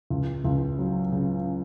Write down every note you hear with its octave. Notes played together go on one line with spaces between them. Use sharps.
C#2
C#2
F#3
C#3